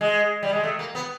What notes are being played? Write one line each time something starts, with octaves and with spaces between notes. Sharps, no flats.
G#3
G3
G#3
A3
A#3
B3